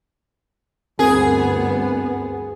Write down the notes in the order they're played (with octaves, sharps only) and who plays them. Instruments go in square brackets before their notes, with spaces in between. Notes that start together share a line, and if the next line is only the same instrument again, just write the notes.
[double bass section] D2 G2 B3 [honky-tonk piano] C4 A#4 [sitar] G#4